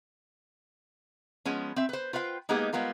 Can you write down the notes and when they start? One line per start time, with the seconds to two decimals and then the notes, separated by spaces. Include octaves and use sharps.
1.45 F3 G#3 B3 C#4
1.76 C4 E5
1.89 B4 C5
2.13 F4 B4 C5 F5 G5
2.49 G#3 A#3 B3 D#4 G4 G#4
2.73 G3 G#3 B3 F4 A#4